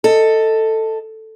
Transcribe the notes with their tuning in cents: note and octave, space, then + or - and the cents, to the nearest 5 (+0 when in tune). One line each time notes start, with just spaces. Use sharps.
A4 +10 D#5 +10